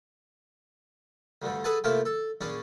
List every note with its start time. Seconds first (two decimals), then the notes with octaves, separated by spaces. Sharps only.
1.42 D2 G2 D3
1.64 G#4 A4 B4 F#5 G#5 A5
1.84 C3 F3 A3 A#3 E4 F5
2.05 A4
2.41 A#1 C#4 D4 G#4